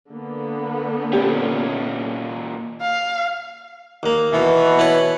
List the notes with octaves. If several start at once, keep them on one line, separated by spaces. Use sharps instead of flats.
D3 A#3 B3
A#2 C#4 G4 C#5 D5
F5
D#2 A#3
B2 E3
E4 B4 C#5